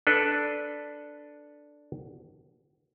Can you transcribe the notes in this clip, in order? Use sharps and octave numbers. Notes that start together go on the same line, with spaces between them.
D4 A4 B4